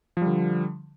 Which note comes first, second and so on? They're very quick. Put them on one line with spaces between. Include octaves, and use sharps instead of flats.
F3 G3 D3